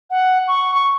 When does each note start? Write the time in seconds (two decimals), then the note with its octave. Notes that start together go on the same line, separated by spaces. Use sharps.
0.10 F#5
0.48 C#6
0.75 C#6